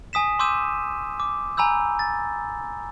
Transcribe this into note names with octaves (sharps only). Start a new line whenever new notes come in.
G#5 D#6 B6 E7
C6 D6 E6 G6 D#7 E7
D6
G#5 A#5 B5 E6 G6
A6